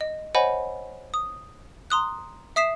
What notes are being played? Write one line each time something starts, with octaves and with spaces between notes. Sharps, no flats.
D#5
C5 C#5 D#5 F#5 G#5 B5
D#6
A#5 C6 D#6 F#6
E5 D#6 B6 C7 E7